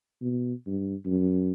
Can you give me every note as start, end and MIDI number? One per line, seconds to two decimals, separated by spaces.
0.21 0.53 47
0.67 0.95 43
1.05 1.52 42